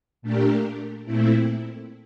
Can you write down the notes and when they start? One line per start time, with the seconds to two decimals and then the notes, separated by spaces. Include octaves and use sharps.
0.22 A#2 A3 D4 G4 A#4
1.05 A#2 A3 C4 E4